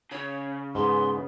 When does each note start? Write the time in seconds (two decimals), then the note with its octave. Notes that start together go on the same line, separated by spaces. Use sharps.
0.11 C#3 C#5
0.75 G#2 B3 C6